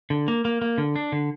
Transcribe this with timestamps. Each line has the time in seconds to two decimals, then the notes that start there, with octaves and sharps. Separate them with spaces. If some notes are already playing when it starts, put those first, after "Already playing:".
0.10 D3
0.28 A#3
0.45 A#3
0.62 A#3
0.78 D3
0.96 D4
1.12 D3